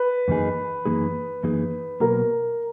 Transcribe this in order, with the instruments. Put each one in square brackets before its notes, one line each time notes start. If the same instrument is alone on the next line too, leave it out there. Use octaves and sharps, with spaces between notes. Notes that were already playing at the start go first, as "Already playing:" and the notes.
Already playing: [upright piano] B4
[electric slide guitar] F#2 E3 A#3 D#4 G#4
F#2 E3 A#3 D#4 G#4
F#2 E3 A#3 D#4 G#4
[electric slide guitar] B2 F#3 A#3 [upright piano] A#4